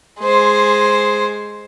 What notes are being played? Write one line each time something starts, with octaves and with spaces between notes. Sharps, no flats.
G#3 C5